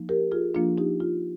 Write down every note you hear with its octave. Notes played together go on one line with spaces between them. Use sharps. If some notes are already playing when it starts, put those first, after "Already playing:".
Already playing: F3 A#3 D#4
G4 A#4
F4 G#4
F3 A#3 D4 F4
D#4 G4
F4